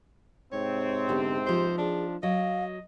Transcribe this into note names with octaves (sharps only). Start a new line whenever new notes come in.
G#2 C3 C4 C#5
D3 B3 G4
F3 D#4 G4 C5
D4 G#4
F#3 D#5 F5